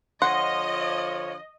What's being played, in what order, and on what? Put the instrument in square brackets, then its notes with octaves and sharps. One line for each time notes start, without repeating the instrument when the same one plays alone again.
[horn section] D3 F3 C#5 [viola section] D#5 [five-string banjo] F#5 [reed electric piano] C6